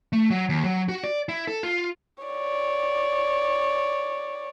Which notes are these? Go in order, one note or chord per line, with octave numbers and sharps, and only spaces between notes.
A3
F#3
D#2
F#3
F#4
D5
E4
A4
F4
C#5 D5